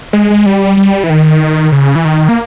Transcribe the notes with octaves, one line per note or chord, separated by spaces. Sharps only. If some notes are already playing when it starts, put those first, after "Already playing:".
G#3
G#3
G3
G3
E3
D#3
C#3
E3
D#3
A#3